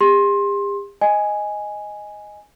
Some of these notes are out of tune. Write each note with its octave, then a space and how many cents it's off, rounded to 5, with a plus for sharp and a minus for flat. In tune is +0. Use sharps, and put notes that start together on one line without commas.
G4 +45 C6 +20
D#5 +0 G#5 +0